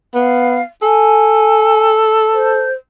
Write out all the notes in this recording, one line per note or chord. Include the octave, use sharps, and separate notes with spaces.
B3 F5
A4 G#5
C5